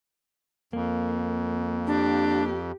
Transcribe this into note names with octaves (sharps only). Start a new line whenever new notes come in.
F2 A#3
D4 G4